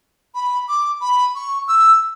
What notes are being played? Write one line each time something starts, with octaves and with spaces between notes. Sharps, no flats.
B5
D6
B5
C#6
E6